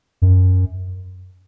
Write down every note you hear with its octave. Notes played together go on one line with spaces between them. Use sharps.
F#2